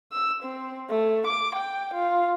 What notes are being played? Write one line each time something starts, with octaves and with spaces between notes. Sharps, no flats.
E6
C4
A3
D6
G5
F4